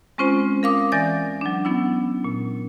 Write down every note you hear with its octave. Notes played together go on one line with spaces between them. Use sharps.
G#3 C4 C#4 F4 C5
A#4 F5 D6 D#6
E3 D5 G#5 A6 A#6
F#3 D4
F#3 B3 C#4 E4
A#2